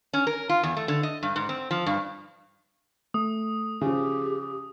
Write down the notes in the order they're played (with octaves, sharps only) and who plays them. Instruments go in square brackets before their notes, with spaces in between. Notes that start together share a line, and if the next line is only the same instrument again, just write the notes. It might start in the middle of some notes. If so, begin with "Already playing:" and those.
[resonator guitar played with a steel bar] C#4
A#4
F4
E2
A3
D3
D#5
G2
G#2
C4
F3
G2
[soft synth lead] A3 [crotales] D#6
[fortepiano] C#3 F3 [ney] G4 [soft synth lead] G#4